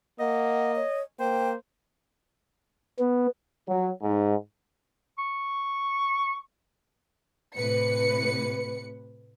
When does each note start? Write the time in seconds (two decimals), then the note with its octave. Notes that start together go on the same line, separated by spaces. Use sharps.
0.20 A#3 D#5 F#5
0.76 C#5
1.20 A#3 C5 G5
2.99 B3
3.68 F#3
4.03 G#2
5.18 C#6
7.56 A2 C3 B4 C#7